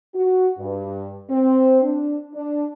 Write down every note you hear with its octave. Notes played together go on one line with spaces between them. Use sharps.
F#4
G2
C4
D4
D4